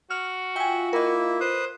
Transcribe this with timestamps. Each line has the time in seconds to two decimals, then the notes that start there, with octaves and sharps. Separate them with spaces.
0.10 F#4 F6
0.56 F4 E5 G5 G#5
0.93 A#3 E4 A#4 D#5 E5
1.40 B4 C5 D#6 F#6